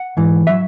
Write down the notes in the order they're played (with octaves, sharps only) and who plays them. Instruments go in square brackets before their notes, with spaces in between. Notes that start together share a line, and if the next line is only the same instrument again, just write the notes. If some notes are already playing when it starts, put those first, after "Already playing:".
Already playing: [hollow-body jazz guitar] F#5
G#2 E3
F#3 E5